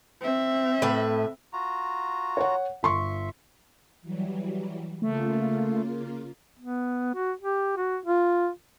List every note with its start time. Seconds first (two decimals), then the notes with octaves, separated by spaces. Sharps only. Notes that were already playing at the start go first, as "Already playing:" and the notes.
0.21 C4 E5
0.82 A2 B4
1.53 F4 F#4 A#5
2.37 C#5 F#5
2.83 G1 E5 C6 C#6
4.02 E3 F#3 G3
5.02 C#3 A3 A#3 F4
6.59 B3
7.15 F#4
7.42 G4
7.76 F#4
8.05 F4